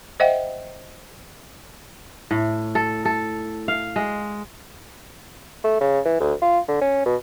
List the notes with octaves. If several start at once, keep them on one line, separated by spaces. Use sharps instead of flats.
C5 D#5 E5 F#5 G5
A2
A4
A4
F5
G#3
A3
C#3
E3
D2
F4
D3
C#4
B2